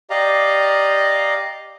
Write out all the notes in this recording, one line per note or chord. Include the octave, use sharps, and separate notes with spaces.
G4 D5 D#5 F5 A#5